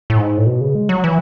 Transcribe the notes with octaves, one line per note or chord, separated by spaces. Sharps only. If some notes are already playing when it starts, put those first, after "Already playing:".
A2
G#2
A2
B2
C#3
G#3
F#3
E3